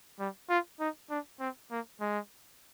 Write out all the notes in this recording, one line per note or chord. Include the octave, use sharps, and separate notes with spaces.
G3
F4
D#4
D4
C4
A#3
G#3